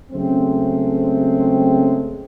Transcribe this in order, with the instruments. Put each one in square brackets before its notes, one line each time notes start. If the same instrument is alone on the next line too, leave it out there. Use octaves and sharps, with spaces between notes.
[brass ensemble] C#3 F#3 G#3 A3 C4